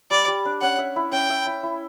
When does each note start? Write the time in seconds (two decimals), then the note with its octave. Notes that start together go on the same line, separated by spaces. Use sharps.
0.11 G3 D5
0.28 G3
0.45 D4
0.62 C#4 F#5
0.78 E5
0.96 E4
1.12 C#4 G5
1.30 E5
1.47 E4
1.63 E4